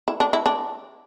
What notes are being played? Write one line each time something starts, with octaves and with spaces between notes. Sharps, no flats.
E4
D4
E4
D4